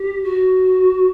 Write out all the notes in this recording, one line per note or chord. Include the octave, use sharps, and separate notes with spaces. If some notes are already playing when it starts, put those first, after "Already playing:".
Already playing: G4
F#4